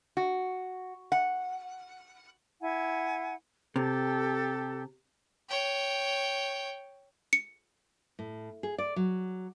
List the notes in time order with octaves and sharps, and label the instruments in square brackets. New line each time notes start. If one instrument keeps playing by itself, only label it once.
[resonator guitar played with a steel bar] F#4
F#5
[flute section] E4 F#5 G#5
[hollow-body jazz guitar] C3 [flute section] G4 A4 A5
[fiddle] C#5 G5
[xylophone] C#7
[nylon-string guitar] A2
G#4
D5
F#3